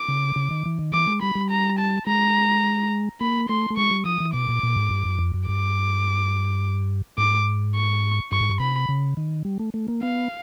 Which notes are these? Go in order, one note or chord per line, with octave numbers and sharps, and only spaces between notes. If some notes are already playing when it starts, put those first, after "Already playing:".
Already playing: D6
C#3
C#3
D#3
E3
D#3
E3 D6
G#3
G3 B5
G3
A#5
A5
G#3 A#5
A#3 B5
A3 C6
A3
G#3 C#6
G3
F3 D#6
E3
B2 D6
A#2
A#2
G#2
G2
F#2
F2
F#2
G2 D6
G#2 D6
C#6
G2 C#6
G#2
G2
C3 B5
C#3
D#3
G3
A3
A3
A#3
B3 F5